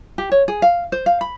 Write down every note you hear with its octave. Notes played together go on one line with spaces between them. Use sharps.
G4
C#5
G#4
F5
C5
F5
B5